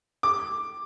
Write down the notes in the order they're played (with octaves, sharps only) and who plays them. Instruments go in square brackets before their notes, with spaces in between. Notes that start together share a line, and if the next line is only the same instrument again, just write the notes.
[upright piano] D6